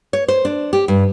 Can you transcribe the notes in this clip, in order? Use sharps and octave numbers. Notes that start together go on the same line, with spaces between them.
C#5
C5
D4
G4
G2